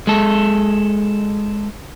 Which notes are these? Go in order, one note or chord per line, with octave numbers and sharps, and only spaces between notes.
G#3 A4